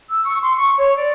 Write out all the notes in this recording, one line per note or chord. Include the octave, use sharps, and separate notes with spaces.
E6
C#6
C6
C#6
C#5
D5